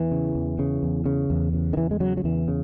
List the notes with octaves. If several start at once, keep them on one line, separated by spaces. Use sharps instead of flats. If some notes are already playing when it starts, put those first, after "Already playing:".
Already playing: E2 E3
C#3
E2
C#3
E2
C#3
E2
C#3
D#3
E2 E3
G#3
C#3 F#3
F#3
E2 E3
C#3